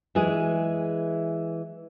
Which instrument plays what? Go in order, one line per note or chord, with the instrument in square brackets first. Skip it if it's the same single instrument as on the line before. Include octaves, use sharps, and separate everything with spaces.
[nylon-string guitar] E3 G#3 G#4